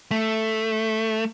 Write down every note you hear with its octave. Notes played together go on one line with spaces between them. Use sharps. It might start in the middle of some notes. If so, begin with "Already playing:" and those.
A3